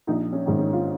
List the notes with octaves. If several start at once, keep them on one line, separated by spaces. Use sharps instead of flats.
A#1 D#4
C#4
G#2 D#3
C#4
F4